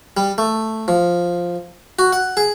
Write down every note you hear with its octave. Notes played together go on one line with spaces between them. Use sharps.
G3
A3
F3
F#4
F#5
G#4